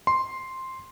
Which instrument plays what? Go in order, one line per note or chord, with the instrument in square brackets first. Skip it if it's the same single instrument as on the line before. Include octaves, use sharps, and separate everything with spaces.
[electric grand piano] C6